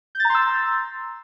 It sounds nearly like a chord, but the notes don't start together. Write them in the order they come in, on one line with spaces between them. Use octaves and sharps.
G6 A6 A#5 C6 E6